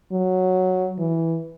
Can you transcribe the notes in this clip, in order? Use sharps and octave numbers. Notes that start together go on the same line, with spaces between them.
F#3
E3